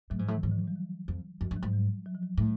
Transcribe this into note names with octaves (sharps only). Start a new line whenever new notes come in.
A2 F#3
G#2 F3
A2 E3
D#3
G#2 E3
F3
F#3
G3
F#3
F2
F#2 F3
G2
F#3
G#2
G3
F#3
F3
F#3
A2 G3